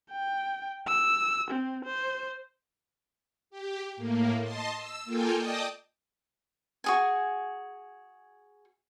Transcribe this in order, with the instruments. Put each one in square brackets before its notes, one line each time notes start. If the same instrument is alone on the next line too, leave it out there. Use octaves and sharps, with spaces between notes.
[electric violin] G5
E6
C4
C5
[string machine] G4
A2 A#3
D#5 A5 C6
E6
A#3 F4 A4 G5 G#5
D5 D#5 G5 A5 D#6
[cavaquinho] F#4 G#4 G#5